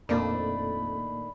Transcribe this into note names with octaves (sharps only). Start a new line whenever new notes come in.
F2 A#2 D#3 A3 A#3 D4 D5 B5